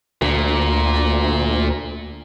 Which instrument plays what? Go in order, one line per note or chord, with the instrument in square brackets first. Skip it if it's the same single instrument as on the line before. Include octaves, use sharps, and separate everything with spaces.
[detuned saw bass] D2 [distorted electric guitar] A#2